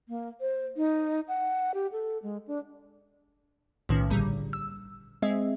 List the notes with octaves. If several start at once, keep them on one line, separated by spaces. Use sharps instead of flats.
A#3
C5
D#4
F#5
G4
A4
G#3
D4
B1 A2 D#3 F3 C#4
G#1 A#2 D3 G3
E6
G#3 C4 G#4 D#5 E5